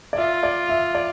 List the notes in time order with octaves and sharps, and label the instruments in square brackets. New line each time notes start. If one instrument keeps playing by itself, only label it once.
[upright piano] D5
[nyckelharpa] F4 [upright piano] E5
[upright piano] D5
E5
D5